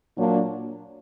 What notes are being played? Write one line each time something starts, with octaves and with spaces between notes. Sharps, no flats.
A#2 F#3 A#3 D4